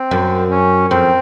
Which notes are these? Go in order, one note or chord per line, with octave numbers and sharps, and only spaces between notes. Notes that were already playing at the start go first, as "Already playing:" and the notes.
Already playing: C4
F#2
C#4
F2 C4